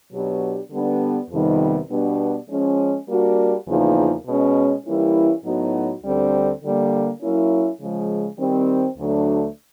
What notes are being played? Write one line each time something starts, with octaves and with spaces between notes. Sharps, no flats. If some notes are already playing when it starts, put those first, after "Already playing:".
B2 F#3 B3 D4 G4
D3 G3 B3 D4
F2 C3 D#3 G3 B3
B2 G3 B3 D4
F3 G#3 C#4
G3 A#3 D4 F#4
E2 C#3 F3 A#3 D#4
B2 G#3 C#4
E3 G3 A#3 C#4 E4
A2 F#3 B3 D#4 F#4
D2 D3 G3 C4
D3 G3 A#3
F#3 A#3 C#4 E4
C#3 F3 G#3
D#3 G3 C4
D2 D3 F#3 A3 D4